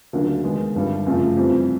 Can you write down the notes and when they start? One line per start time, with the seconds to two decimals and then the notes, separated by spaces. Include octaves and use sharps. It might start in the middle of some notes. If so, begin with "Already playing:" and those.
0.13 D2 C#3 F#3 A#3 D4
0.44 D#2 D#3 G#3 B3
0.75 G1 G2 D#3 G3
1.06 F#2 C#3 F3 A3
1.37 F2 C3 E3 G3 C4